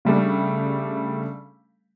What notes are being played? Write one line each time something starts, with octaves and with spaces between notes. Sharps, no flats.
C#3 G3 A3 D4